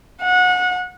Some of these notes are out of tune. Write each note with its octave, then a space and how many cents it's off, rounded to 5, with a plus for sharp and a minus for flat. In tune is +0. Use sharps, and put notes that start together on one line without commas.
F#5 -25